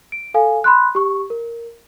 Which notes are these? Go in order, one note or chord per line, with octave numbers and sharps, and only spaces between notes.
D7
A4 F5 G#5
B5 C6 F#6
G4 C#6
A#4